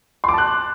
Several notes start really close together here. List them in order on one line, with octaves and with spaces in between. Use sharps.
C6 D6 A5 F#6